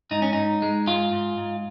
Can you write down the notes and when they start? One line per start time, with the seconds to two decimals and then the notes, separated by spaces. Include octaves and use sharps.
0.11 G#2 D#4
0.22 C#4
0.33 G#2 D#4
0.62 G#3
0.87 G#2 F4
1.12 G#2
1.38 G#2